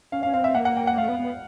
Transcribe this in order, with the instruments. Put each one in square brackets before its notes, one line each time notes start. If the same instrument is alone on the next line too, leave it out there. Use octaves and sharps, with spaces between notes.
[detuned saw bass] C#4 [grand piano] F5
[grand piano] F5
[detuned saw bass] C#4
[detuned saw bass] C4 [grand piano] F5
[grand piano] E5
[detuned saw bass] A#3 [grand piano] F#5
[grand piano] F#5
G5
F#5
[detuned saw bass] A3 [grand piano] F5
[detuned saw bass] B3
B3